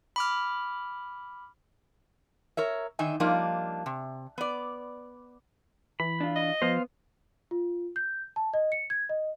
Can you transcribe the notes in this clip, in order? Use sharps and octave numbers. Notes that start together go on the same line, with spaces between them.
B5 D6 F6
A#4 C#5 E5
D3 D#3 D#4 E5 G#5
F3 G3 A#3 D4 D#4 F4
C3
B3 D5
E3 B5
D4 F4
D#5
F3 B3 C5 F5
F4
G6
A5
D#5
C#7
G#6
D#5